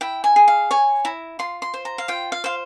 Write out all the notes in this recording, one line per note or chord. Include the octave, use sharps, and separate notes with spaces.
E4 G5
G#5
G#4
F5
C#5 G#5
E4 A#5
F4 C6
C6
C5
A#5
F5
F4 G5
F5
C5 F5